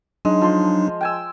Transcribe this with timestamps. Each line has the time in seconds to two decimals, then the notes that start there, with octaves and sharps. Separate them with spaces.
0.25 F#3 G#3 D4 D#4
0.41 F3 C6
1.01 G5 G#5 E6